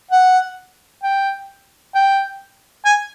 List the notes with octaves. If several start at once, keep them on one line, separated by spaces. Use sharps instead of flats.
F#5
G5
G5
G#5